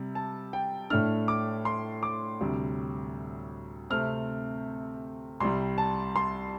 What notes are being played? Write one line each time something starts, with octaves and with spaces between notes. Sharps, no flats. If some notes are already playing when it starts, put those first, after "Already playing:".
Already playing: C3 G3
A5
G5
A2 A3 D4 F6
D6
C6
D6
D2 C3 G3
C3 A3 C4 F6
C2 C3 G3 C6
A5
C6